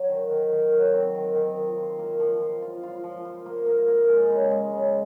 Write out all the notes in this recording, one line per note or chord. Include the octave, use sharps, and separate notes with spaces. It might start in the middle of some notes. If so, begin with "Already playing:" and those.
Already playing: F#3
D#3
D#3
D#3
F#3
C4
D#3
D#3
F4
C5
A#3
F3
C5
F4
F4
F3
C5
A#3
A#3
A#3
G#3
C#3
G#3
C#3